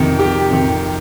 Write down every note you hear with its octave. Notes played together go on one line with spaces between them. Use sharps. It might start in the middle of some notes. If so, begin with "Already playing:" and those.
Already playing: F2 C3 D#3
G4
F2 C3 D#3